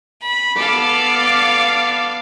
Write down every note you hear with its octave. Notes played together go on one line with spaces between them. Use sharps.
B5
B3 A4 D5 F5